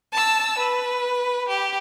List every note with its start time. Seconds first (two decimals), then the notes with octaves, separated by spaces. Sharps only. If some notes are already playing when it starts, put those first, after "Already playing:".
0.13 A5 E6
0.58 B4
1.49 G4